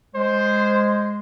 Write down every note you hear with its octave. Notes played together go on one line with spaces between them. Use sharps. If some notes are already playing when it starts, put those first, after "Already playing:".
G#3 C5